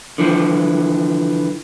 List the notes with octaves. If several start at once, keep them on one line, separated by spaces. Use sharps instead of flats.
D3 E3 F3